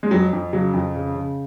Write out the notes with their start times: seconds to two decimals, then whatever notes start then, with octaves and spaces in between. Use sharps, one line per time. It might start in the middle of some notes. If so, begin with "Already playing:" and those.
0.03 G#3
0.11 F2 F#3
0.33 F2
0.52 C#3 F#3
0.74 F2
0.95 C#3
1.14 C#3